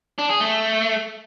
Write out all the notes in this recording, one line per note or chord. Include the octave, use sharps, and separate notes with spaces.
D4
G#4
A3